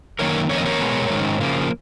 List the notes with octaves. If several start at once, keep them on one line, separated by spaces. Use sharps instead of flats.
F#2 D#3 A#3 A#4 C#5
F2 D#3 A#3 C#4 C#5
D#5
A#4 C#5
B2 G#3 B3
G#2 D#3 G#3 C#4
C#3 F3 A#3